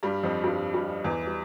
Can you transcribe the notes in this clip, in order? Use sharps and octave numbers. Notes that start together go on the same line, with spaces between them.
G2 G3
F2 F3
G2 G3
G2 G3
E2 E3
G3